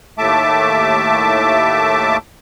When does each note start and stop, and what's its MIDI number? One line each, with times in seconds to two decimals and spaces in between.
0.18 2.17 39
0.18 2.17 45
0.18 2.17 57
0.18 2.17 76
0.18 2.17 81
0.18 2.17 86